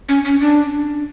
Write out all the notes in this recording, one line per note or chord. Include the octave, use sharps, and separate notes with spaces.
C#4
C#4
D4